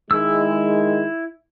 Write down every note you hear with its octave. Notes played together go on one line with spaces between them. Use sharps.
D#3 G#3 E4 E6